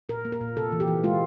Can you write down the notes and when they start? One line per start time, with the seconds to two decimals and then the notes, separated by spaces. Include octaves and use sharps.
0.09 A#2 A#4
0.25 A#3
0.32 A#4
0.41 A#2
0.56 C3 A4
0.72 E3
0.80 G4
0.88 E3
1.03 G#3 F4